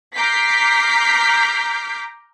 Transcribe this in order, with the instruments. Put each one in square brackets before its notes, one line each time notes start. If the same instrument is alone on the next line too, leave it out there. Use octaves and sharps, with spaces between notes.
[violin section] A#5 D6 F6 G6 B6 C7